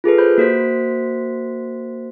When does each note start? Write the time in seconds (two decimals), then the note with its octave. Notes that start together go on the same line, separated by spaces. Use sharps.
0.04 F4 G#4 A4 B4
0.18 C5 B5 G6
0.38 A#3 F#4 C5 B6